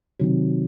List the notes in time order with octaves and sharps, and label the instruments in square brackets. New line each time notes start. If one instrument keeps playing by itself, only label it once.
[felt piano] C3 D#3 F#3